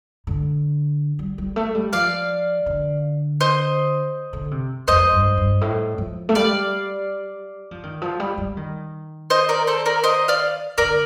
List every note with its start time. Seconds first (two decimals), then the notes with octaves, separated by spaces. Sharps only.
0.27 D3
1.19 G3
1.38 G3
1.56 A3
1.75 G3
1.93 F3 D5 F5
2.66 D3
3.41 C5 D#5
4.33 D3
4.51 C3
4.88 F2 C5 D#5
5.12 G2
5.37 G2
5.61 A2
5.98 F3
6.29 A3
6.35 G3 D5 F5
7.71 F3
7.83 D#3
8.02 F3
8.20 G3
8.38 G3
8.57 D#3
9.30 C5 D#5
9.49 A#4 D5
9.67 A4 C5
9.86 A#4 D5
10.04 C5 D#5
10.28 D5 F5
10.78 D3 A#4 D5